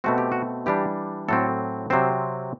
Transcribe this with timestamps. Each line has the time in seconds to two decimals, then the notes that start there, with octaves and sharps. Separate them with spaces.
0.04 B2 A3 C4 F#4
0.18 G4
0.32 F#4
0.66 E3 G3 D4 G4
1.29 A2 F#3 C4 A4
1.90 C3 F#3 C4 C5